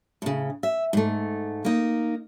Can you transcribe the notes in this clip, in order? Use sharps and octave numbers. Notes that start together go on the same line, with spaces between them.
A2 C#3
E5
G#2 A3
A#3 D#4